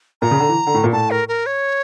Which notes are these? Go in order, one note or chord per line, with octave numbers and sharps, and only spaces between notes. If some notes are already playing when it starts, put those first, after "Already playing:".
A#2 A#5
C#3
D3
E3
D3
A2
A#2
A2 A5
A#4
A#4
C#5